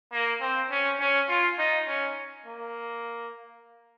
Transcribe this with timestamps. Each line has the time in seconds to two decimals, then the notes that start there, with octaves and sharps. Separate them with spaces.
0.12 A#3
0.41 C4
0.71 C#4
1.00 C#4
1.29 F4
1.59 D#4
1.87 C#4
2.46 A#3